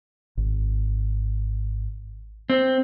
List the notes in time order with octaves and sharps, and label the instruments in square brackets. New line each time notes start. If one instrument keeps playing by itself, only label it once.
[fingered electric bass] G#1
[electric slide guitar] C4